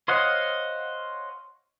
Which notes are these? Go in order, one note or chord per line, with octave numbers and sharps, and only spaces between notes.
C5 C#5 D#5 F5 F#5